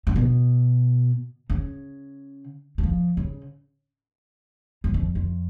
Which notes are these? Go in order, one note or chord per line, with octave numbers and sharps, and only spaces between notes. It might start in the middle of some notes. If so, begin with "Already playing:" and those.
C#3
B2
C#3
F#3
F3
C#3
F#2
F2
F2